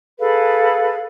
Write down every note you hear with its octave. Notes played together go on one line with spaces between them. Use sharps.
G#4 A4 B4 F5